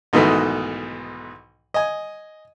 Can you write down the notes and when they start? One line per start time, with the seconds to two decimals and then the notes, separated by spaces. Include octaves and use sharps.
0.13 B1 G#2 B2 D#3 E3 A3
1.74 D#5 G#5